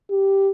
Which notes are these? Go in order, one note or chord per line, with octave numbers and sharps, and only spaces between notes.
G4